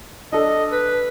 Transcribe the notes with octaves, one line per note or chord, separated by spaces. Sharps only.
D4 A4 D#5
B4